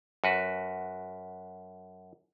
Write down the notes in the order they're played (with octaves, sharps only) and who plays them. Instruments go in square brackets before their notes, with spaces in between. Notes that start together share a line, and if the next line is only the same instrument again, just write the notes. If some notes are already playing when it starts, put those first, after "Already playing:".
[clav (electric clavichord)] F#2 F#4 B4